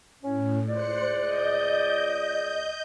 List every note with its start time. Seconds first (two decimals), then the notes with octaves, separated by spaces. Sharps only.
0.23 A2 C#4
0.68 C#2 C5 D5 F#6 C#7
1.19 D#5 G6